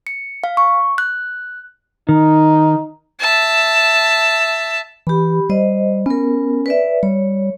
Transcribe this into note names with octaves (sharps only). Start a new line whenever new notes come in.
C#7
F5
C#6
F#6
D#3 D#4
E5 A5
E3 G4 B5
G3 C5 D#5
B3 C#4 A#4
B4 D5 E5
G3 C#5